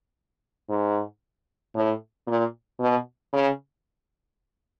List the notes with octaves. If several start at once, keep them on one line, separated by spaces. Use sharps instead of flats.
G#2
A2
A#2
B2
C#3